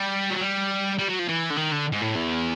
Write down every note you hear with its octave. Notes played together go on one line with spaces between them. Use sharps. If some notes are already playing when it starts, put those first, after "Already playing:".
Already playing: G3
F#3
G3
G3
F#3
F3
E3
D3
D#3
D3
G#2
A2
E2